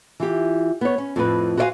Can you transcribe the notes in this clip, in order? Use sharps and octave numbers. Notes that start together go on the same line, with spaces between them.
E3 F4 G4
B3 C#5
C#4
F2 A2 C4 B4
F#4 A4 C5 D5 F5 G#5